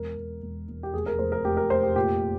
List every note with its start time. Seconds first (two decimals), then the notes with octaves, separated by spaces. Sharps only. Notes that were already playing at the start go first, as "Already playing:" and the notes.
Already playing: E1 A#4
0.17 E1
0.42 E1
0.68 E1
0.83 G4
0.94 F1 G#4
1.06 A#4
1.19 F1 C5
1.32 A#4
1.44 F1 G4
1.57 A#4
1.70 F1 C5
1.83 G4
1.96 A#2 G4